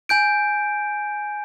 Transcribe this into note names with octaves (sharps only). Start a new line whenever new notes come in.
G#5 G6 D7